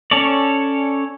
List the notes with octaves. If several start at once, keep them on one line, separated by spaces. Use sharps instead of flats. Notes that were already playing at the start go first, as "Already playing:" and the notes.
C#4 A4 C#5 D5